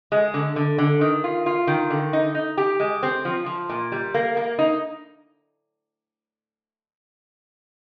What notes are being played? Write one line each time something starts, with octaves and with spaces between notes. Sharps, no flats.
G#3
D3
D3
D3
D#3
F4
F4
D#3
D3
D#4
D#4
G4
G#3
C4
F3
F3
A#2
G3
A#3
A#3
D#4